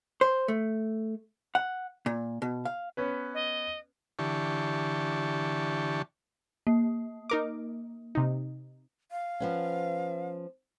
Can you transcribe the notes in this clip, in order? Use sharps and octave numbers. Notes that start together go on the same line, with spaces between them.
C5
A3
F#5
A#2
B2
F5
B3 C#4 B4
D#5
D3 E3 G4 A5 C#6
A#3
D#4 A#4 D6
C3 D#4
F5
F3 B3 C#4